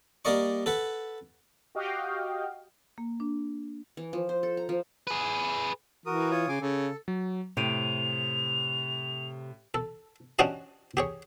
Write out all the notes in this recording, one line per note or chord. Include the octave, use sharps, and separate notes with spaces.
G3 A#3 A#4 D5 D#5 C#6
A4 B4 F#5
F#4 G4 D#5 F5 G5
A#3
D4
E3
F3
C5
A4
A#5
F3
G#4 B4
E3 F#4 A#4 D#6
F4 C#5 D#6
C#3 G#5 C6 D6
C#3 A4
F#3
A2 C3 D7 D#7 F7
A4
C#4 D4 F#4 G4 D#5 A5
G4 G#4 C#5